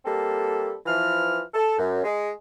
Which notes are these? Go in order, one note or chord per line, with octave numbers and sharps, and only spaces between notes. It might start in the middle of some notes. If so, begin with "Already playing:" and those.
G3 A#3 C4 A4
E3 F3 F6
A4
F#2
G#3